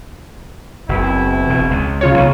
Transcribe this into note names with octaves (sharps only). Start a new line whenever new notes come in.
F#1 B2 C4 E4
E1
C#2
C#3 F4 C#5
B1